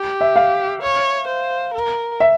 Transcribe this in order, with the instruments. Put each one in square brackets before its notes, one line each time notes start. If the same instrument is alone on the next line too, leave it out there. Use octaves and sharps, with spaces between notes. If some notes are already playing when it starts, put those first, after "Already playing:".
Already playing: [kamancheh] G4
[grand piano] E5
F5
[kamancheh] C#5
C5
A#4
[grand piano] E5